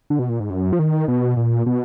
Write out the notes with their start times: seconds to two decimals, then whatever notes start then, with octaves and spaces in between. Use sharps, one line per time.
0.10 D3
0.19 B2
0.29 A#2
0.40 G#2
0.50 F#2
0.73 F3
0.79 D#3
1.08 B2
1.37 A#2
1.66 B2